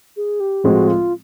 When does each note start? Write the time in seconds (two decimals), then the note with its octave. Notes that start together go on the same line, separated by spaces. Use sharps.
0.17 G#4
0.40 G4
0.64 A2 F3 G#3 C4 F#4
0.88 F4